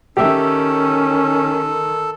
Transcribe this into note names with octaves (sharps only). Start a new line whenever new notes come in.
D#3 C#4 G4 A4 E5